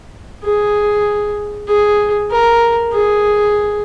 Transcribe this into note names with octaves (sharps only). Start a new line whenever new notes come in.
G#4
G#4
A#4
G#4